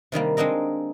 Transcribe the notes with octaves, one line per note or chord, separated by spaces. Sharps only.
C3 D#3 G3 A#3
G#3 C4 D4 D#4 A#4